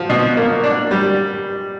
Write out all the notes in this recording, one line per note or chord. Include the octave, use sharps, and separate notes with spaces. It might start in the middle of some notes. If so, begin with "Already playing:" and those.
Already playing: F3
B2
A#3
D4
G3